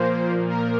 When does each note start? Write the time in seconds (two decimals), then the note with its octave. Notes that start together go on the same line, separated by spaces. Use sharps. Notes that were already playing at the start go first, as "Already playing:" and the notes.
Already playing: A#2 F3 A#3 C5
0.49 A#4